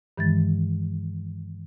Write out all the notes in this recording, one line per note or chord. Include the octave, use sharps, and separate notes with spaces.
G2 D#3 E3 G#3 A6